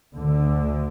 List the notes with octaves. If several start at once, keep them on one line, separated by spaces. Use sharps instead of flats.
D2 D3